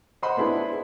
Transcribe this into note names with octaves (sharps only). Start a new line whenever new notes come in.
C5 D#5 F#5 B5 C6
B3 D4 E4 G#4